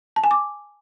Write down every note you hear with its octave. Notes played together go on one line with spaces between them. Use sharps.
A5
G#5
D6